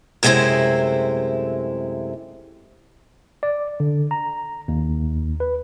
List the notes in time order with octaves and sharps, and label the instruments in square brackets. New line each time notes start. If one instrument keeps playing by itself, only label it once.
[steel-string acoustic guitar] F#2 C3 G#3 A3 E4 C5
[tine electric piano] D5
D3
A#5
D#2
B4